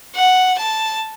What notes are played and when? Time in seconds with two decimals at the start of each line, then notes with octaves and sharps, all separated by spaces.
0.16 F#5
0.59 A5